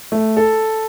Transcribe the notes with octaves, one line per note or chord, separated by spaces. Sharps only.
A3
A4